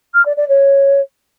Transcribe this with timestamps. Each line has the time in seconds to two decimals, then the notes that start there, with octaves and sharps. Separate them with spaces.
0.14 F6
0.25 D5
0.37 D5
0.48 C#5